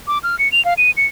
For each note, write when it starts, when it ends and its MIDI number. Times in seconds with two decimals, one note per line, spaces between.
0.08 0.18 86
0.23 0.38 89
0.39 0.51 97
0.52 0.64 101
0.65 0.74 77
0.78 0.91 99
0.97 1.06 97